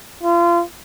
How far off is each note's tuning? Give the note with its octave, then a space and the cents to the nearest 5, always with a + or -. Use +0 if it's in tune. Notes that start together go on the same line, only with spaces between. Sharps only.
F4 -30